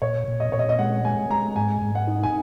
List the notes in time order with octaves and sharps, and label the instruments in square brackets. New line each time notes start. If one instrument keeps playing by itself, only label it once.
[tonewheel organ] A#2 [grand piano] C#5
[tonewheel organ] A#2
[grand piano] D#5
[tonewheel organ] A#2 [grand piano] C#5
[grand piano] D#5
D#5
[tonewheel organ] G#3 [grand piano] F#5
[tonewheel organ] G#3 [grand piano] G#5
[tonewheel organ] G#3 [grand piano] A#5
[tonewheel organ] G#2 [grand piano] G#5
[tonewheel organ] G#2
[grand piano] F#5
[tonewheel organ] D#4
[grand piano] G#5